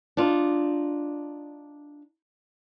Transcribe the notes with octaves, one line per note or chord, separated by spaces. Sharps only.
D4 D#4 F4